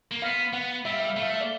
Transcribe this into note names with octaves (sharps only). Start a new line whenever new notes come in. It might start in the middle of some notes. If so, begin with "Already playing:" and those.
A#3
B3 F5
B3 F#5
G3 E5
F5
E5
F5
A3 E5
F5
E5
D5